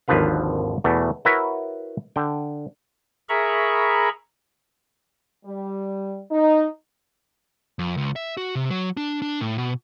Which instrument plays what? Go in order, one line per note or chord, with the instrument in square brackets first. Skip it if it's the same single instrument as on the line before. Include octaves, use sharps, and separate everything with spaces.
[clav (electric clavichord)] G#1 D#2 D3 F3 B4 F5
E2 B2 A3
E4 F#4 A#4 B4 C#5 E5
D3 G5
[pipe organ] G#4 A#4 E5 A#5 B5 C#6
[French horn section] G3
D#4
[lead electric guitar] F2
C#2
E5
F#4
C3
F#3
D4
D4
A2
B2